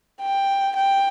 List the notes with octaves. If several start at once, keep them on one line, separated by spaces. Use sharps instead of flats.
G5
G5